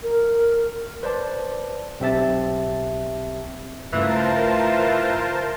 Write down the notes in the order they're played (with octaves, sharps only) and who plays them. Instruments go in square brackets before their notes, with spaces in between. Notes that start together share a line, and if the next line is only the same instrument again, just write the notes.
[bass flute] A#4
[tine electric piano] B4 C5 D5 A5
B1 C4 G4 E5 A5 A6
[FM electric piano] G2 C#3 A3 [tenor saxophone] E3 [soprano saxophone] F4 [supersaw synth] A#4 C5 A5